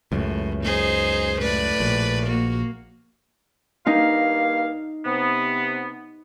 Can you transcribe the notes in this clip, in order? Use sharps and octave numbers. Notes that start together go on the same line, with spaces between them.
C#2 F#2 A2
D#4 G#4 C5
A2 B4 D5
A#1
A#3 F#4
G2 A#3 D#4 F5
C3 B3